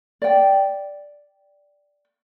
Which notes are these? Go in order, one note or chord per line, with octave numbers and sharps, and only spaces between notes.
D5 G5